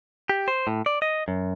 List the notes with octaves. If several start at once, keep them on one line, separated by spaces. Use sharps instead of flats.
G4
C5
A2
D5
D#5
F#2